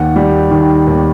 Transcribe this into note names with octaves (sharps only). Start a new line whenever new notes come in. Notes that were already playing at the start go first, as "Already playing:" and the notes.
Already playing: D#2 F#5
G3
D#3
D#2